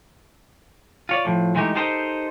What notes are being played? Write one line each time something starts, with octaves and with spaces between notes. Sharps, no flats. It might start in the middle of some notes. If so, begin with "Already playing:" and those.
F4 C#5 D5
A2 F3
E3 G#3 A3 D#4 G4
D#4 G4 A4 A#4 C5 D#5